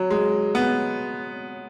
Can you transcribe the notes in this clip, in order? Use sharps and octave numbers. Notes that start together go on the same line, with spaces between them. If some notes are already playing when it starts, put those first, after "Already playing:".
Already playing: F#3
G#3
B3